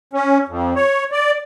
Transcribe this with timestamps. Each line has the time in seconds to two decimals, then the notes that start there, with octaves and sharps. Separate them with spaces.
0.13 C#4
0.48 F2
0.75 C#5
1.12 D5